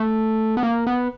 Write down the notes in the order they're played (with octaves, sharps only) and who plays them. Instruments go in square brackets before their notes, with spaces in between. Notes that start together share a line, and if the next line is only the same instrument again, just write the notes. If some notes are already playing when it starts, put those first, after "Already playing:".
Already playing: [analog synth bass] A3
B3
A#3
B3